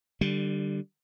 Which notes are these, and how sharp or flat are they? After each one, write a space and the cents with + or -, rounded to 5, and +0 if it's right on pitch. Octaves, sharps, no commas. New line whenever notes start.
D3 +15 G3 -10